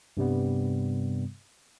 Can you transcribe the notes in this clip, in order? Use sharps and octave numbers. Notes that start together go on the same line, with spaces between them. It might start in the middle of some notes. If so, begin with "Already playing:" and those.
G2 C3 G3 B3